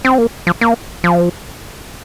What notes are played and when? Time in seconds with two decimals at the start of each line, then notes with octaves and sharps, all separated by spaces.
0.05 C4
0.18 A#3
0.47 F3
0.61 A#3
1.04 F3